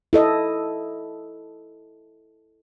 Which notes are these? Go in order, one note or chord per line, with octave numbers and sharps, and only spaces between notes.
E4 A4 D#5